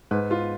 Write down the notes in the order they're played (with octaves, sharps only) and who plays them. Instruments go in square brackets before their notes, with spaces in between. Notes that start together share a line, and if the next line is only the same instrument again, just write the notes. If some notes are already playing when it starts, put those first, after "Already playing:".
[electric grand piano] G#2 [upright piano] B4
[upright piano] F4